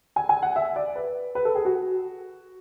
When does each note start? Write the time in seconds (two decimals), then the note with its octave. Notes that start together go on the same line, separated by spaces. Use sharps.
0.16 G#5
0.29 G#5
0.42 F#5
0.56 E5
0.76 D5
0.96 B4
1.35 B4
1.45 A4
1.55 G#4
1.65 F#4